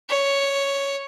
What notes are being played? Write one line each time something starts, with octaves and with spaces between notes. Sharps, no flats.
C#5